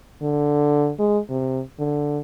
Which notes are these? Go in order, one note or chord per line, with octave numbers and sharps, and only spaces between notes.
D3
G#3
C3
D3